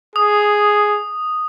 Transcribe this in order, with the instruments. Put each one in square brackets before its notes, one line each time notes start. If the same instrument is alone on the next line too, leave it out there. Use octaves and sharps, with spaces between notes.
[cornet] G#4 [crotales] D#6